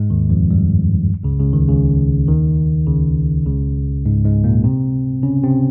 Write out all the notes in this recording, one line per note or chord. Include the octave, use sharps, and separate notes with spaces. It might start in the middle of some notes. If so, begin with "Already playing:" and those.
Already playing: G#2 G#3
D#2 D#3
F2 F3
G2 G3
C#2 C#3
C#2 C#3
D#2 D#3
C#2 C#3
D#2 D#3
C#2 C#3
C#2 C#3
G#2 G#3
G#2 G#3
A#2 A#3
C3 C4
C#3 C#4
C3 C4